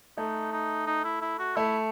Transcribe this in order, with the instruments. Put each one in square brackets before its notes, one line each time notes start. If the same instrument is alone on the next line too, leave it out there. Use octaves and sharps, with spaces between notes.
[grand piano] A3 [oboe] D#4
[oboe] D#4
D#4
E4
E4
F#4
[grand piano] A3 [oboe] E4